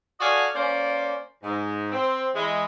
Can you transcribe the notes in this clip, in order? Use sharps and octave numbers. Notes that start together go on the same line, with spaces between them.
F#4 A4 D5 D#5 F5 G#5
A#3 C#4 C5 D5
G#2
C4
E3 G#3